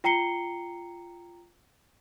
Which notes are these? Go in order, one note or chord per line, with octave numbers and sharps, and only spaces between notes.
F4 G5 A#5 C7 C#7 G7